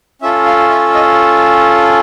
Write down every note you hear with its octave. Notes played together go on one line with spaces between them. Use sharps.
C#4 F4 A4 E5
F5
E5
D#5